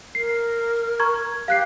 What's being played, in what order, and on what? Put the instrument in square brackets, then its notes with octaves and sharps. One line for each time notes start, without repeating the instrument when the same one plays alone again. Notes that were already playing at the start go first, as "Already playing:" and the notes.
[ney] A#4 [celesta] C7
[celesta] A#5 C#6 G#6
[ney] G4 [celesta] F5 F#6 C7